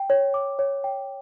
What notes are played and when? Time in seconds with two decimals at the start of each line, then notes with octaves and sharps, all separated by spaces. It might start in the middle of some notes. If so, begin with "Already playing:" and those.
Already playing: G5
0.10 C#5
0.34 D6
0.59 C#5
0.84 G5